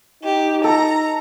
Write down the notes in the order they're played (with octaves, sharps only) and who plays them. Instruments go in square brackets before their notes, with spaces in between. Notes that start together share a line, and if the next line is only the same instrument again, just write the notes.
[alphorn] D#4 [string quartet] G4
[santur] A4 [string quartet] A#5